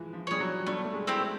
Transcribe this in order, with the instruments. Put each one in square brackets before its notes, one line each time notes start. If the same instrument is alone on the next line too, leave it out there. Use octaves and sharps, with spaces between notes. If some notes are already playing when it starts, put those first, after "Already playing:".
Already playing: [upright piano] E3 F3 G#3
F3
[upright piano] G3 [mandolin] G#4 C#5
[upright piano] F#3
[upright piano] G3 [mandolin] A3
[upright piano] A3
G#3
[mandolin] C4 E4 G4
[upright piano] A3